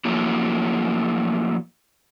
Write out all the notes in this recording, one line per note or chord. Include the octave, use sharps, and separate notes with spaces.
F3 F#3 A3 A#3 E4